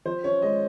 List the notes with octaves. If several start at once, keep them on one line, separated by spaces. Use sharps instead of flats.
F3 C5
C#4 C#5
G#3 D#5